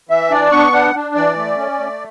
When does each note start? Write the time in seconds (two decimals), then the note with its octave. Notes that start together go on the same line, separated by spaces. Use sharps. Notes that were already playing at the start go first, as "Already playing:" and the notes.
0.09 E3 E5
0.31 D4 D5
0.52 B3 C#6
0.72 D4 F#5
0.94 D4
1.15 E3 D5
1.36 A3
1.57 C#4
1.79 A3